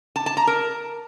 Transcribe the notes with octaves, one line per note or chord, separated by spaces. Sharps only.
A5
A5
A#5
A#4